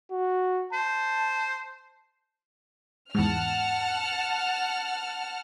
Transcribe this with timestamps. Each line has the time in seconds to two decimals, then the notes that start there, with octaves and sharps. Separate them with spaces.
0.12 F#4
0.73 C5 A5
3.15 E2 G#2 F#5 A5 F6